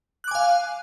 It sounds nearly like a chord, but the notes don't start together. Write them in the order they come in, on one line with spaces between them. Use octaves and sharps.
F#6 D6 G#5 F5